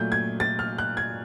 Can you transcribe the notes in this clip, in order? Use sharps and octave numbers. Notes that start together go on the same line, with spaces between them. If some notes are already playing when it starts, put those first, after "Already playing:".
Already playing: A#2 F#3 A3 G6
G#6
A6
F6
F#6
G#6